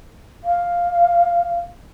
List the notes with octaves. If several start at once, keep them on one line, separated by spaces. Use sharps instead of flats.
F5